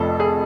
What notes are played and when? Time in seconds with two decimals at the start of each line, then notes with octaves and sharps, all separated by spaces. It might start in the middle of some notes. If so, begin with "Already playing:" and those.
Already playing: F1 F2 F3 A4
0.20 G#4